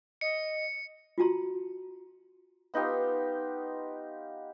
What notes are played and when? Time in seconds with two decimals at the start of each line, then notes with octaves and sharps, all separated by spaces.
0.21 D#5 C#7
1.18 F4 F#4 A5 A#5 C6
2.74 B3 D#4 F4 G4